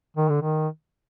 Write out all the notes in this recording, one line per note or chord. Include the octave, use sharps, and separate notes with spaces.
D#3
D3
D#3